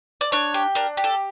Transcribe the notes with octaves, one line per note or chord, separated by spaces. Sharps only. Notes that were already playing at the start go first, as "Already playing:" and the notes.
D5
D4 C#5
G4
D4 A#4
G4
A4